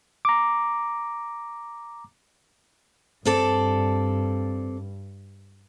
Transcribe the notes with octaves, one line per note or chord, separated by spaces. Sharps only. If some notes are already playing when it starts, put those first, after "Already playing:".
A#5 D6
G2 C4 A4 D5